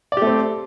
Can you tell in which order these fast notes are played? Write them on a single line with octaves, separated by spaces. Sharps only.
D5 G4 A3 C4